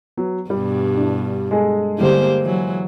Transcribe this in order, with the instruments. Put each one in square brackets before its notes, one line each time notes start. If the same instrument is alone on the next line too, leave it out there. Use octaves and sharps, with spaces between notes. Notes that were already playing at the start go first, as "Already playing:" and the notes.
[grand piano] F#3 [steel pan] B3
[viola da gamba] G2 B2 [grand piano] G3
[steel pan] D4 E4
[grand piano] G#3 G#4 A4
[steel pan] D3 G3 E4 [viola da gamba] A#3 G4 C5
[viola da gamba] E3 F#3